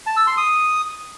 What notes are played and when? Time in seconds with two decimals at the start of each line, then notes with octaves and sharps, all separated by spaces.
0.06 A5
0.17 E6
0.27 C6
0.37 D#6